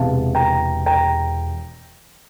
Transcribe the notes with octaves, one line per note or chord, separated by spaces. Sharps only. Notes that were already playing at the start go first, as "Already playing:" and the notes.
Already playing: E1 E2 C3 F5 A5
G5 A#5
G5 A#5